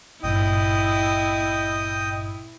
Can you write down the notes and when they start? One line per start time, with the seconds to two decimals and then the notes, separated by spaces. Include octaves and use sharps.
0.23 G#1 G2 A#2 E4 D#5 G5 D#6